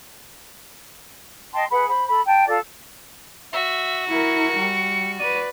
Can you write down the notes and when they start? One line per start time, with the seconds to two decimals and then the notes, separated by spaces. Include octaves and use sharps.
1.52 D#5 G5 A5 C6
1.70 G#4 B4 F#5 B5
1.87 C5 B5
2.08 A4 B5
2.25 G5 A5
2.46 F4 A4 D5
3.53 F#4 E5
4.08 E4 A#4 C#7
4.59 G3
5.19 B4 D5 D#7